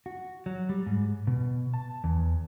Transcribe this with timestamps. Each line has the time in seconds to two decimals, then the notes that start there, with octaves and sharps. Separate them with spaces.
0.06 F#4
0.46 F#3
0.69 G3
0.86 G#2
1.27 B2
1.74 A5
2.04 E2